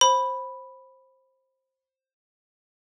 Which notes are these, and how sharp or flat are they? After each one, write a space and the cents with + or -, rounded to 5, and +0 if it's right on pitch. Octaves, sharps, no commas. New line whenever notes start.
C5 +15 B5 +0